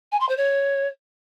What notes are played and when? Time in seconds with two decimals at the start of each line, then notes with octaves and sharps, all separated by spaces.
0.12 G#5
0.20 C6
0.29 C5
0.37 C#5